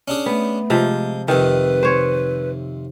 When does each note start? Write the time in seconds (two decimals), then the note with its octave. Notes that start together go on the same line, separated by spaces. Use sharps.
0.08 C#4 D4 G#4
0.26 A3 B3
0.70 C3 F3 G#3
1.28 F2 C3 D#3 B4
1.83 C5 C#5